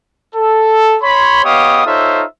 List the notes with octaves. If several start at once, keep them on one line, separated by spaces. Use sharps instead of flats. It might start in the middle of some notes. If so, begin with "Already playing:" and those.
A4
C#5 B5 C6
B3 G4 C#5 D#5 F5 D#6
D#4 F4 A4 C5 C#5 E5